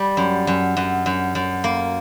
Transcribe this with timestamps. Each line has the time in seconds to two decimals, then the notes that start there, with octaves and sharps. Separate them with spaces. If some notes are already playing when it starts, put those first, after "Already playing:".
Already playing: G3
0.17 F#2
0.47 F#2
0.77 F#2
1.06 F#2
1.35 F#2
1.64 A#3